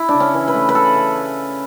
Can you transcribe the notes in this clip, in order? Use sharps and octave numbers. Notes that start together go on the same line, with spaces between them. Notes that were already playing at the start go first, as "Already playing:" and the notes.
Already playing: E4
D4
C#3
C#4
E3
B4
A3
B4
C#3 A4
C#3